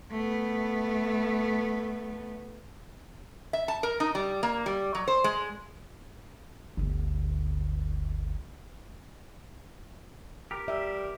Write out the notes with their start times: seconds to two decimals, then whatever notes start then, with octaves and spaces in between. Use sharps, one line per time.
0.11 A3 B3
3.53 E5
3.68 A5
3.83 A#4
4.00 D#4
4.15 G3
4.43 A#3
4.66 G3
4.95 F#3
5.08 C5
5.24 G#3
6.77 G1 D2
10.51 G4 A#4
10.68 G3 E5